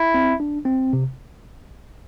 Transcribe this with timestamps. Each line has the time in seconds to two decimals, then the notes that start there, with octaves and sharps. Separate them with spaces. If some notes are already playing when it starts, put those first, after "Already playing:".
Already playing: E4
0.14 C4
0.40 D4
0.65 C4
0.93 C3